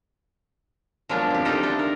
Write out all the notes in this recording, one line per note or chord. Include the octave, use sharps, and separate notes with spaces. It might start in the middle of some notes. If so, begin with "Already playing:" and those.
F3 F#3 G#3 A#3 B3 D4
C4 G4
D#4 F4 G4 A4 D#5
B3 D4 E4
A#4